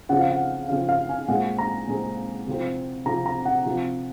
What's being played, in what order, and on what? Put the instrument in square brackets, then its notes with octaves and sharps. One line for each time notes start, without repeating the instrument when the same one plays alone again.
[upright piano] C#3 F3 C4 F#5
F5
F#5
C#3 F3 C4 F5
F5
G#5
A#2 G#3 C4 F#5
A#5
A#2 G#3 C4
C3 F3 C4
C3 F3 C4 A#5
A#5
F#5
C3 F3 C4